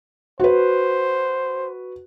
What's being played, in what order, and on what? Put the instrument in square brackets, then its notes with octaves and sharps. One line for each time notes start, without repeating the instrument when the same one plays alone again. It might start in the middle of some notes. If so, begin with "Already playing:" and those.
[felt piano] F#4 B4 [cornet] C5